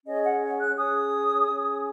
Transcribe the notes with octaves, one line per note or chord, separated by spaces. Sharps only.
C#4 G#4 C#5 D#5
F#5
F#6
C#4 G#4 C#5 D#6
C#4 G#4 C#5